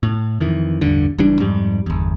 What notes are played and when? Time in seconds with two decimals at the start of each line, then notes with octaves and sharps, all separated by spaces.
0.03 A2
0.40 F2 D#3 E3
0.81 A1 E2 G2 D3
1.18 F#1 E3 G3 D4
1.39 F2 G#2 G3
1.86 G1 E2